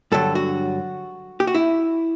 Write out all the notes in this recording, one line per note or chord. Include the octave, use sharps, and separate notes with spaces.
G2 D3 F#3 A4
F#4
G4
F#4
E4